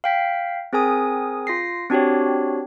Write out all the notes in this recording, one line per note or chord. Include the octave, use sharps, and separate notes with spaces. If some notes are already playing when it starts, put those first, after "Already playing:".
F5 G5 B6
C4 G#4 A#4 G#5 D#6
F4 A#6 C7
C4 D4 F#4 G4 C#5